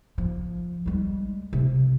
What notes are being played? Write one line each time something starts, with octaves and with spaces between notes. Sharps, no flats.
F3
G3 G#3
C3